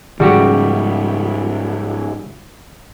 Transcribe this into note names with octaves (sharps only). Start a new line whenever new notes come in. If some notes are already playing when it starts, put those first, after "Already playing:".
G#2 C#3 F3 G3 F#4 G4